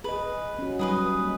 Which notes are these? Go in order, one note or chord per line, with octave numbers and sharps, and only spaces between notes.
G#4 B4 D#5
C#4 F#4
F#3 G3 D#4 G#4 B4 D#5
A#3